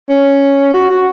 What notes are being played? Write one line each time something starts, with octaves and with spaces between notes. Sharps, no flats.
C#4
F#4
F#4